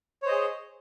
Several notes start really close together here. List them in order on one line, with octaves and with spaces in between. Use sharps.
C#5 C5 D#5 G#4